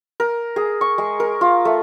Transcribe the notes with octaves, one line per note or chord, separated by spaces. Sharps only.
A#4
G#4
C#6
G#3
A#4
F4
A3